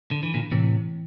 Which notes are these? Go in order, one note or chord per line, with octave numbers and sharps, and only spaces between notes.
D3
E3
A#2 D3
A2 C3 E3